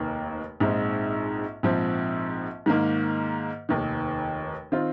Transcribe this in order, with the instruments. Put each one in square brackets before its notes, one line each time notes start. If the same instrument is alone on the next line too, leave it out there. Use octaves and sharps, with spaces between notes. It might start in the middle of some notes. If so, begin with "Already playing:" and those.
Already playing: [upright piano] F1 D#2 D#3 A#3
A#1 G#2 G#3 C4 D#4
A#1 G#2 F3 C4
G#2 D#3 A#3
F1 D#2 D#3
D#3 C4 F4